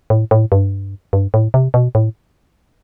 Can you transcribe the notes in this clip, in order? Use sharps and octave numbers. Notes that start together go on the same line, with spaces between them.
A2
A2
G2
G2
A2
C3
B2
A2